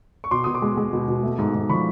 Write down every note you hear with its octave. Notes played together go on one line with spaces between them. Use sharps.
C#6
B2 C6 D6
B2 D#6
C6 D6
G#3
G#3
B2
B2
A3
G#2
G#2
F3 B5 C#6